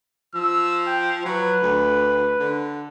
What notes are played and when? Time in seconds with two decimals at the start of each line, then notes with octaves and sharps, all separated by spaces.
0.35 F3 E6
0.87 G5
1.25 F#3 B4
1.62 D2
2.40 D3